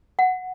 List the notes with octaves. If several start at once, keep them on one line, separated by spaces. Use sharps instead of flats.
F#5